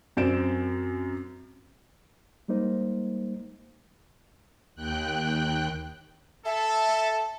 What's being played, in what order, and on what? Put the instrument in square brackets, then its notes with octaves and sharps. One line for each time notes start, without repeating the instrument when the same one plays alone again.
[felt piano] F#2 C4 D5 G6 D7 E7
[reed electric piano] G3 G#3 A#3 D#4 C5
[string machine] D#2 G5 F#6
[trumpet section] A4 [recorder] E5 [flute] A5